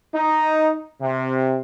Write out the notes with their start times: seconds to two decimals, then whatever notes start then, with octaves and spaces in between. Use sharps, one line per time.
0.14 D#4
1.01 C3